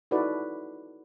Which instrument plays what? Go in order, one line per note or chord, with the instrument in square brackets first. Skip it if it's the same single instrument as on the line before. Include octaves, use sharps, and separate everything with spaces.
[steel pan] D#4 E4 F#4 A4 B4 D5